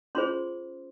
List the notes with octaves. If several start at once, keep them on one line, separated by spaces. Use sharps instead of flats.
C#4 F4 G#4 C5 C6